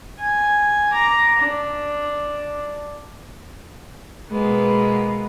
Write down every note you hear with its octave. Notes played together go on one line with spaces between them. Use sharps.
G#5
A#5 D6
D4
B2 G#3 A#3 B3